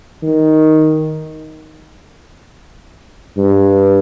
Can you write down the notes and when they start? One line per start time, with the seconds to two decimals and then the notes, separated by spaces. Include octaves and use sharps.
0.23 D#3
3.38 G2